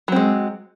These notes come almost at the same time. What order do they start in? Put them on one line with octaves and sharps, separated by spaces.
F#3 C4 G#3